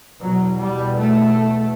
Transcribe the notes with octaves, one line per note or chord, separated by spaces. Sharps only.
E2 B2 F#3
G3
A3